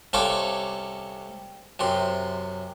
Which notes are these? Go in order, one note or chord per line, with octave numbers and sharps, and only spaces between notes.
C2 C#4 A4 F5 C6 D6
F#2 C3 C6